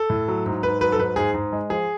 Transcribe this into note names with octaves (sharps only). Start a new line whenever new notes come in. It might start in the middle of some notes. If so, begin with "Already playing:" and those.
Already playing: A4
A2
F#3
G#2
G#2 B4
F#3 B4
A4
G#2 B4
G#2 G#4
G#2
G#3
F3 G#4